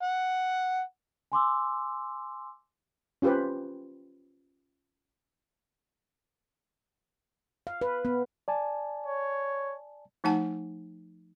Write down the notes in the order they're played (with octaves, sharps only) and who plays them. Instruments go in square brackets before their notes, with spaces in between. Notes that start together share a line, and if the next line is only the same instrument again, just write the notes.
[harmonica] F#5
[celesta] G#5 C6 D6 E6
[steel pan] C#4 F4 G4 B4 C5
[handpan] F5
B4
B3
[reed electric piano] D5 G#5 A5
[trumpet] C#5
[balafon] F3 A3 D#4 F#5 G#5 A5